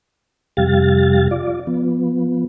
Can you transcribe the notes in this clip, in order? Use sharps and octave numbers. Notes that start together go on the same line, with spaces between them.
F2 C3 G3 G4 F5 A6
F4 D5
F3 B3